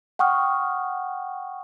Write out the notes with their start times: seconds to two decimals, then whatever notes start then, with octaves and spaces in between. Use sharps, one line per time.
0.19 F#5 G5 C#6 D#6 F6